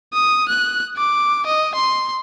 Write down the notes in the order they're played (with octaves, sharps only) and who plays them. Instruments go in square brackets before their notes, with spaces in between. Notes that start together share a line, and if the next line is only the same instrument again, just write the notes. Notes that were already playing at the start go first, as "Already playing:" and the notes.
[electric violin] D#6
F#6
D6
D#5
C6